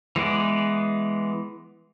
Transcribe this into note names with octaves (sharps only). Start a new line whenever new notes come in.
E3 G#3 B3 D5